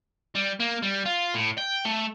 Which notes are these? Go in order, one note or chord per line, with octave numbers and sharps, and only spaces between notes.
G3
A#3
G3
F4
A2
G5
A3